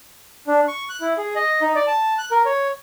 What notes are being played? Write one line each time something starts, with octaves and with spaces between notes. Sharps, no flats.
D4
C#6
F#6
E4
G#4
D#5
D#4
D5
A5
F#6
A#4
C#5